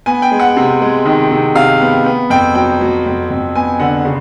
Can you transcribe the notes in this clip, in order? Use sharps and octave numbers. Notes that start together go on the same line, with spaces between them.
B3 G#5
G5
G#3
F#5
C3
G#3
D#3
C3
C3 F5
B3
B3
F2 G5
F#3 G5
F#3
F2
F2
B3 G#5
D3 F#5
C#3